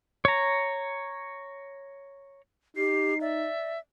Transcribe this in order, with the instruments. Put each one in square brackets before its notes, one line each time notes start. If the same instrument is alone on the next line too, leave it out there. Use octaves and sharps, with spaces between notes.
[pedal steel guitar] C#5 A#5
[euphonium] D#4 [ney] G4 [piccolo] C7
[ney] D5 [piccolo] E5